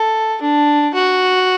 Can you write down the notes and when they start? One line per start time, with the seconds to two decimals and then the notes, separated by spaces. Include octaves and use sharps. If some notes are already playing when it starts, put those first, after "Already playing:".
Already playing: A4
0.41 D4
0.95 F#4